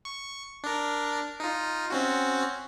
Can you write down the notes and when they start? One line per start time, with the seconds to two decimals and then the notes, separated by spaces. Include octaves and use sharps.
0.05 C#6
0.64 D4 A#4
1.40 D#4 F4
1.90 C4 C#4 F#4